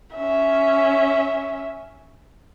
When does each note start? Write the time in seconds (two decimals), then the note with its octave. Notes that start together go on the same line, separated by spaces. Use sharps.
0.16 C#4 E5